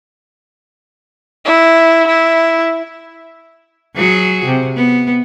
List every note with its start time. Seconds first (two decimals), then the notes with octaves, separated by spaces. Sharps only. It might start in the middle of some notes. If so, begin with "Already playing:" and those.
1.45 E4
2.07 E4
3.96 F#3 F#4 G#4
4.45 C3
4.76 B3